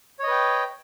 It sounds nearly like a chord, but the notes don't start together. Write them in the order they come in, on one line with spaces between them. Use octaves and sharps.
C#5 D#5 B4 G5